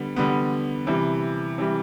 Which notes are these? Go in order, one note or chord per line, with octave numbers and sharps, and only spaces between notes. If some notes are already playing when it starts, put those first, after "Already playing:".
Already playing: D3 G3 B3
D3 G3 B3
C3 E3 G3
C3 E3 G3